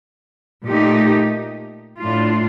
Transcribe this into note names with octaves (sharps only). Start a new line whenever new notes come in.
A#2 A3 D#4 G4
A2 A3 D4 F4